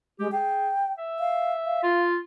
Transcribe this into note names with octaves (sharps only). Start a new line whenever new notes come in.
G#3 G4
G#4 G5
E5
F5
F5
F4